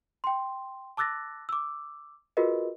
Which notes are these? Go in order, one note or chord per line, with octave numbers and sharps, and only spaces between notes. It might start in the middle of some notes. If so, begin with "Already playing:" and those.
G5 C6
A5 D6 E6 F#6 A6 A#6
D6 E6
F4 F#4 G#4 A#4 B4 D#5